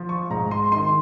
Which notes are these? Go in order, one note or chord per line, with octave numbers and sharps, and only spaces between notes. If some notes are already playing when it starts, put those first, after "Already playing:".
Already playing: F3
C#6
G#2 A#5
C6
D#3 C6